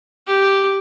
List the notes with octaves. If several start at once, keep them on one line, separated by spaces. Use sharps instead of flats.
G4